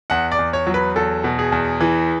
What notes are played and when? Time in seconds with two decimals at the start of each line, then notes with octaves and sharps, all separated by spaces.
0.10 E2 F#5
0.32 D5
0.39 E2
0.53 C#5
0.67 F#3
0.74 B4
0.96 E2 A4
1.24 B2
1.39 G#4
1.52 E2
1.81 E3